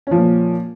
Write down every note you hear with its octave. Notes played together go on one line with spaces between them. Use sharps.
A#2 F3 C#4